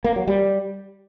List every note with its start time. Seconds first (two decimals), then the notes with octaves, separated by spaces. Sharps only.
0.04 A#3
0.16 F#3
0.28 G3